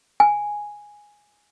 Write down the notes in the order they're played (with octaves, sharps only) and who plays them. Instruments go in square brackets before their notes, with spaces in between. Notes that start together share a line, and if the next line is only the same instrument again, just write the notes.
[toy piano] G#5